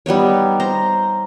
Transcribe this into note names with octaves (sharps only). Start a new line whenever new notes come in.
G3 B3 D#4 C#5
C5 A#5